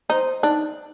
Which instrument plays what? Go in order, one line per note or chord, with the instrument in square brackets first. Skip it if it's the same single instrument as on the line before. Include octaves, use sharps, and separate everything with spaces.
[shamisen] D#4 [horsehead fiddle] C5
[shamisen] D4 [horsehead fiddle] D#4